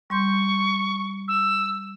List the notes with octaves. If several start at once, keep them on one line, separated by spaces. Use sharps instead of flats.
G3 C6 C#6 G6
E6